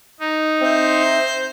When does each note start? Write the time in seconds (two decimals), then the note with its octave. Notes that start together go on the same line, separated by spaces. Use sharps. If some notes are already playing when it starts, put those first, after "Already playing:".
0.20 D#4
0.61 C4 C5 E5